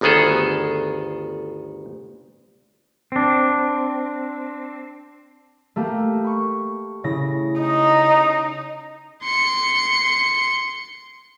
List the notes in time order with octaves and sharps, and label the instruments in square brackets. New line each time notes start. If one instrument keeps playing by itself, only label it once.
[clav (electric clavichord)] G1 D2 D#3 B3 G#4 A4
[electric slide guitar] C4 D4
[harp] A3 A#3 G4
B5 C#6
C#3 E4 A#6
[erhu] D#4
[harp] D7
[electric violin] C6 C#7